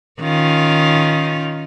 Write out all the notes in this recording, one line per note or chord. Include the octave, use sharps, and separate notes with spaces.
D#3 C#4 F4